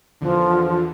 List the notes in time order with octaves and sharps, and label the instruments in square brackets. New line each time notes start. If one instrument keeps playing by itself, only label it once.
[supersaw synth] E2 D3 [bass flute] F3